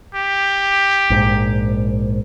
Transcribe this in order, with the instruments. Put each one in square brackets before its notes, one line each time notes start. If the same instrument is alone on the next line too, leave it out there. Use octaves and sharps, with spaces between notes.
[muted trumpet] G4
[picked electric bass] A#1 G#2